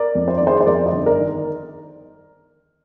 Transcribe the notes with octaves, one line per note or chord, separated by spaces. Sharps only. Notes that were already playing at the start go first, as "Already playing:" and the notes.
Already playing: A#4 D5
F2
C5
D#3 D5
G#4 C5
C5
F2 A#4 D5
C5 D#5
G1
A#4 D5
D#3